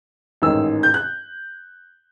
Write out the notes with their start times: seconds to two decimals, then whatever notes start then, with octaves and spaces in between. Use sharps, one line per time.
0.42 A1 G#2 D#3 E6
0.83 G6
0.94 F#6